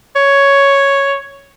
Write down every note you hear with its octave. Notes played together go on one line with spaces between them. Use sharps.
C#5